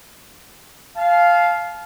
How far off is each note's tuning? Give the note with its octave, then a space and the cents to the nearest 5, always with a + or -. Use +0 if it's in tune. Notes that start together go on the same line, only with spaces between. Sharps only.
F5 +0 A5 -35